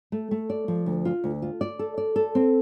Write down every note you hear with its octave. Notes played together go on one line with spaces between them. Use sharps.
A3
A3
D5
F3
D2
F4
D2
F4
D5
A4
D5
A4
C4